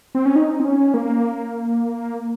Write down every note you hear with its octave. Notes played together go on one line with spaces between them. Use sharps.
C4
C#4
D#4
C4
C#4
A#3